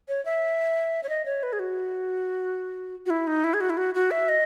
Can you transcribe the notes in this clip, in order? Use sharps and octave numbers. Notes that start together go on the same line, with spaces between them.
C#5
E5
C#5
D#5
C#5
B4
G#4
F#4
F#4
E4
D#4
E4
G#4
F#4
E4
F#4
F#4
E5
D#5